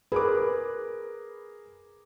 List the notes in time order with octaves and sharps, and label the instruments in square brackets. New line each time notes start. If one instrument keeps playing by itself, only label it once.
[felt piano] G#4 A#4 D6 [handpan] B4